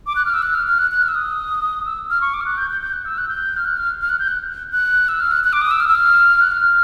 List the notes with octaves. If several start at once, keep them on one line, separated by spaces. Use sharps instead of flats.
D6
F#6
F6
E6
F#6
F6
F6
F#6
F#6
F6
E6
D#6
E6
F6
C#6
D6
F6
F#6
G6
G6
G6
F#6
E6
F#6
G6
F6
F#6
F6
F6
F#6
G6
F#6
F#6
E6
F6
F#6
F#6
D6
D#6
E6
F6
E6
F6
F#6
F6